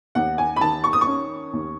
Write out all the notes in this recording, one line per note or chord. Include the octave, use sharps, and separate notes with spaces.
D#2 F#5
G#5
B5
D#3 A5
C#6
D#6
C#6
C#4
D#2